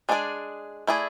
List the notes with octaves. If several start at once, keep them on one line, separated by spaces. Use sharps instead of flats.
G#3 D4 G#4 D5
A3 E4 G#4 D5